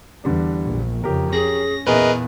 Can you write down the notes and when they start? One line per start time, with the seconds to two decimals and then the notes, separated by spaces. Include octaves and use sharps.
0.24 E2 D3 G3 D4
0.65 A#1
1.04 F2 C#3 G4 A#4
1.33 C#4 G#4 A#6
1.87 E2 A#2 B3 G#4 A#4 B4 D#5 E5